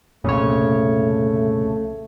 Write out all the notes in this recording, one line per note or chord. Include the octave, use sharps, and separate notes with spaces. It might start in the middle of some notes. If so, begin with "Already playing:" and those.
C2 F2 A#2 C#3 A3 C#5